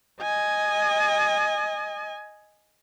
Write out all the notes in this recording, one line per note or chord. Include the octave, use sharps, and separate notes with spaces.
D#5 G#5